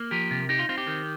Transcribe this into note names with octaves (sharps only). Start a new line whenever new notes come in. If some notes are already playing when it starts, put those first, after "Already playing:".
Already playing: A#3
F3 G4 A#4
C3
D#4 G4
F4
C4 F4
G4
D#3